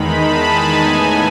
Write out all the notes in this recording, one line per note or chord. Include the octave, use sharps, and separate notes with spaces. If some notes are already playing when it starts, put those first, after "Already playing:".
Already playing: E2 D#3 G#3 D#4 B5
A5
G#5
A2 E3 B3 D#4